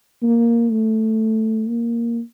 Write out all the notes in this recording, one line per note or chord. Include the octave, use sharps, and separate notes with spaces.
A#3
A3
A#3